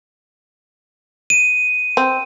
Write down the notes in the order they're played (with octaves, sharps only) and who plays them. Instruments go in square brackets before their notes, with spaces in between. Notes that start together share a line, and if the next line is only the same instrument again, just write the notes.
[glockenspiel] D#7
[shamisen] C4